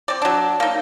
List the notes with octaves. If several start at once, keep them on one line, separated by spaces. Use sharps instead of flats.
C4 D5
F#3 D4
A#3 D#4